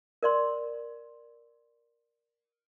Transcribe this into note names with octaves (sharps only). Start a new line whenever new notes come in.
A#4 D5 C6